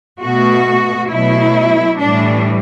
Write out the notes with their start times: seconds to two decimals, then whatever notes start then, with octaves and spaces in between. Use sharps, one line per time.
0.21 B2 A3 F#4
1.11 B2 F#3 A3 E4
2.01 A2 E3 G3 D4